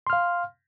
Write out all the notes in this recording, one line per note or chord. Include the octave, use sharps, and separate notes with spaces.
F5 C6 F6